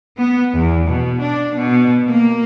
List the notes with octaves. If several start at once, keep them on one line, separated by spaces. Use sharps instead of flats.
B3
E2
B2
D4
B2
A#3